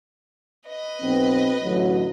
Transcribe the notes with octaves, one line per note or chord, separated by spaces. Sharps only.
B4 D#5
B1 B3 C4
A1 D2 F#3